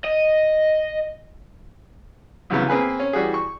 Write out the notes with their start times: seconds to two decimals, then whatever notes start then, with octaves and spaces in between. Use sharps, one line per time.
0.05 D#5
2.50 C2 F#2 C#3 E3 F#3 B3
2.69 A#3 C4 G#4 B4 G#5
3.00 C#4
3.13 E3 G3 F#4 G#4
3.34 C#6